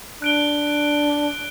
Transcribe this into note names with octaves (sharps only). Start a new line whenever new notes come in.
D4 F#6 D7 G7